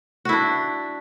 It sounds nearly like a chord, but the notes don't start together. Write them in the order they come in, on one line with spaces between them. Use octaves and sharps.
F#4 E4 D4